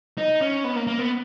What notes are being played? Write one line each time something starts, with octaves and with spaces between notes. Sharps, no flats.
D#4
C#4
B3
A#3
A#3
B3